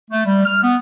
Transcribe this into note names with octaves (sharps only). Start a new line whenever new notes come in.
A3
G3
F6
B3